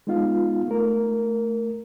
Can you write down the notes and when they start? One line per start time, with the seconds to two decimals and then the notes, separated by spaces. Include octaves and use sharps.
0.07 G#3 B3 D#4 F4 F5
0.68 A3 A#4